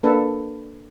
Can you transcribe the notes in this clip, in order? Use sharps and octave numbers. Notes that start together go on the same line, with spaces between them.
A#3 D4 A4 B4